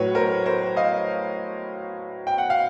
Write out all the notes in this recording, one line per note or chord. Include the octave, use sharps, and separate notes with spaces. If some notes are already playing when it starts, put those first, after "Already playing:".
Already playing: A2 F#3 B4 C#5
A#4 C5
A#4 C5
D#5 F5
G5
F#5
F5